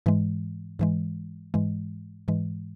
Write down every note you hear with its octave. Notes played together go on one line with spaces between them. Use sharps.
G#2 E3 G#3
G#2 E3 G#3
G#2 E3 G#3
G#2 E3 G#3